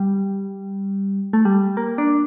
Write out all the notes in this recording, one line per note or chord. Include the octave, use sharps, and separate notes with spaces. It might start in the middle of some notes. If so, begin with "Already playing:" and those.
Already playing: G3
A3
G3
A#3
D4